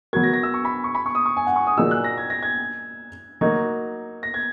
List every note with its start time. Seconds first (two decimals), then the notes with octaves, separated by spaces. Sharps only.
0.13 F#3 B3 F#4 A#4 G#6
0.23 A#6
0.33 A#6
0.43 E6
0.54 C#6
0.65 B5
0.84 C#6
0.95 B5
1.06 C#6
1.15 D#6
1.26 C#6
1.37 G#5
1.47 F#5
1.56 C#6
1.67 D#6
1.77 A#2 F#3 A#3 D#4 G#4 E6
1.91 F#6
2.04 A#6
2.18 G#6
2.30 A#6
2.43 G#6
3.41 F#3 A#3 D#4 F#4 G#6
4.23 A#6
4.34 G#6